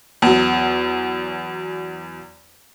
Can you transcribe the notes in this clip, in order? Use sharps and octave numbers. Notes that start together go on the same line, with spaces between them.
E2 F#3